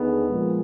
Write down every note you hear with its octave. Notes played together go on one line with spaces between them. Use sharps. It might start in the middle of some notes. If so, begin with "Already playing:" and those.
Already playing: D#2 D3 B3 D#4 G#4
A#2 F3 G#3